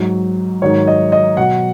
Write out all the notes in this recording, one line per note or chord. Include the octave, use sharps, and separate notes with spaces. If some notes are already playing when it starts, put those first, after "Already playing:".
Already playing: G#2 F#3
G#2 D#3 F#3 C#5
D#5
D#5
B2 F#3 F#5